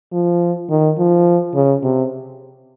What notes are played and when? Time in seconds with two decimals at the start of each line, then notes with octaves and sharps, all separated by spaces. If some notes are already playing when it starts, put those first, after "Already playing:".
0.12 F3
0.70 D#3
0.98 F3
1.55 C#3
1.83 C3